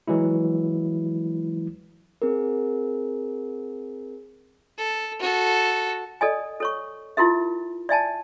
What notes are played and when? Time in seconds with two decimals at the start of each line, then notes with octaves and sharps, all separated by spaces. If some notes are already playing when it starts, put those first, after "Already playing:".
0.08 E3 F#3 G#3 E4
2.22 C4 G#4 A#4
4.78 A4
5.20 F#4 A4
6.21 A4 D5 D#5 G#5
6.60 A4 C#5 C#6
7.17 E4 F4 G4 A#4 E5
7.89 D5 E5 G#5 A5